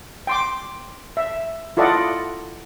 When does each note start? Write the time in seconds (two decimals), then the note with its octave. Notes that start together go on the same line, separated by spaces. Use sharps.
0.27 G5 C6 D6
1.17 E5
1.77 E4 F4 A4 D5 D#5 F#5